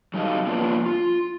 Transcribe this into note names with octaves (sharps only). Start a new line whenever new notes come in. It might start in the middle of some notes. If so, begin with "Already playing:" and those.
F#3 G3 D#4 A4 D#5 F5
F3 A#3 B3 C#4 D4 F4
F4